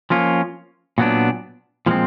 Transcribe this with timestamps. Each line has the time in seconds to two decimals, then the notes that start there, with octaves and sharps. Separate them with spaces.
0.10 F3 A#3 C#4 F4
0.98 A#2 F#3 B3 D4
1.86 A#2 F3 G#3 C4